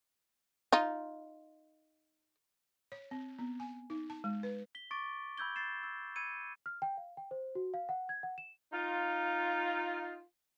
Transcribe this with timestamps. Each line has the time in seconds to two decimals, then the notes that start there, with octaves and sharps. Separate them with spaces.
0.72 D#4 F4
2.92 C#5
3.11 C4
3.39 B3
3.60 G#5
3.90 D#4
4.10 A5
4.24 G#3
4.43 B4
4.75 B6 G7
4.91 C#6 D6 A6 D7
5.37 B5 E6 G6 G#6 G7
5.56 A6 C7 E7
5.83 E6
6.16 B5 E6 G#6 C#7 D#7
6.66 F6
6.82 G5
6.97 F5
7.17 G5
7.31 C5
7.55 F#4
7.74 F5
7.89 F#5
8.09 G#6
8.23 F#5
8.38 E7
8.73 D#4 F4